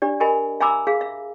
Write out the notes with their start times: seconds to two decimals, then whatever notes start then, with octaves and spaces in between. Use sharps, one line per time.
0.02 D4 G4 D5
0.20 G4 A#4 D#5 G#5 B5
0.60 E5 G#5 A#5 B5 D6 E6
0.87 G#4 F5
1.01 E5